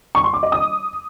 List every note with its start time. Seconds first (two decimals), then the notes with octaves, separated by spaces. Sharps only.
0.15 C#6
0.24 C6
0.33 D6
0.43 D#5
0.52 D#6